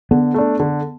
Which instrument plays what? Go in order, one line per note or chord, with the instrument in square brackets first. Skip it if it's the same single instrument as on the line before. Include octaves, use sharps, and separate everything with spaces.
[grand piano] D3 [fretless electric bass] B3
[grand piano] A3 D4
D3